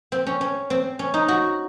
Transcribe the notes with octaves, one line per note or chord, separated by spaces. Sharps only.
C4
C#4
C#4
C4
C#4
D#4
F#4